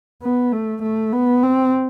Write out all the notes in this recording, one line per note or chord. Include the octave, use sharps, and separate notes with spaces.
B3
A3
A3
B3
C4